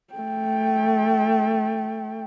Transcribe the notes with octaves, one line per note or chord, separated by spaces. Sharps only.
A3 G5